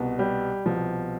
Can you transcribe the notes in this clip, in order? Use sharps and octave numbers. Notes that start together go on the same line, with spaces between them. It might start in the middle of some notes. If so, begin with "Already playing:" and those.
Already playing: C2 B2 B3
G3
C2 B2 F3 B3